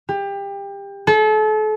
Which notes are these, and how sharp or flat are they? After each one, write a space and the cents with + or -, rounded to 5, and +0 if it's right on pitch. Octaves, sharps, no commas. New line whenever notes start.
G4 +25
A4 -35